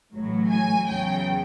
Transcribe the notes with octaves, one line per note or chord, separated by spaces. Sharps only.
A1 A2 F#3
G#5
E2 C#3 F#3 G5